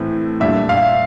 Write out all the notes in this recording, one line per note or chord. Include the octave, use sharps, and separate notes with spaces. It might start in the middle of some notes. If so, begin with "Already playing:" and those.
Already playing: A2 E3 A3 C4
A#2 G3 D4 E5
F5